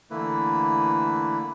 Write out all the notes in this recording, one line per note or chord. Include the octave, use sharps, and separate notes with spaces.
D3 E3 A3 A#3 E4 B4